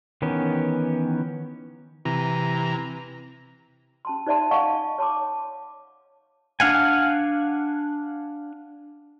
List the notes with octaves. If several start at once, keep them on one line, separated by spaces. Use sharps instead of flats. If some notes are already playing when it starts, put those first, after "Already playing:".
D#3 E3 B3 C#4 G4
C3 E3 A#5
C#4 A5 C6
D#4 C5 D5 E5 A5 C6
D#5 F5 F#5 G#5 A5 C#6
C#5 A5 C6 D6
D4 F5 F#5 G#5